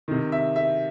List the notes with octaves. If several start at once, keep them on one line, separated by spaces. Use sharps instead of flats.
C3 D#3
E5
E5